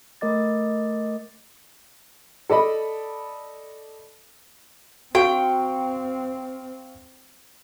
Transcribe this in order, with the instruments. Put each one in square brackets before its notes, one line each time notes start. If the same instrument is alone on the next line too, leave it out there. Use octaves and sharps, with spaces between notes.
[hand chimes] A3 A#4 D#5 D6 A6
[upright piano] A4 D5 D#5 B5
[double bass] C4 [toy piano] F#4 [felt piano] F5 C#6 [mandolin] G5